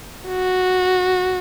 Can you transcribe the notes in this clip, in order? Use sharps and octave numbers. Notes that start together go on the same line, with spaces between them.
F#4